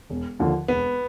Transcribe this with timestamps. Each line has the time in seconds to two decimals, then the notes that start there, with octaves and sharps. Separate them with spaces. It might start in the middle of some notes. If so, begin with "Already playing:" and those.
0.10 E1
0.39 D#2 D3 F3
0.68 E1 B3